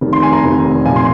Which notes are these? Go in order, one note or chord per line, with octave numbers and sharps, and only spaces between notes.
F1 F2 D#3
C6
G#5
A#5
F1 F2 D#3
C2 A#2 F3 G#5
C6